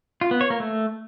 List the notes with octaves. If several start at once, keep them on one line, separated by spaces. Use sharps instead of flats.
F4
B3
C#5
A#3
A3